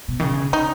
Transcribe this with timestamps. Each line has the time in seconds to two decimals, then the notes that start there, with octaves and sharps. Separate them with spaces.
0.08 B2
0.20 D#3
0.23 C#3
0.52 C#3 D#4